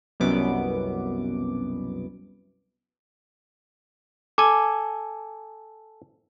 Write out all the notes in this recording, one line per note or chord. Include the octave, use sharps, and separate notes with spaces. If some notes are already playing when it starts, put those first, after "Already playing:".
C2 F#2 B2 B3 D6
A4 G#5 D6